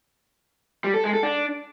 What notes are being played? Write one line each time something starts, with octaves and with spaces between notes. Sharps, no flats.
G3
A4
G#3
A4
D4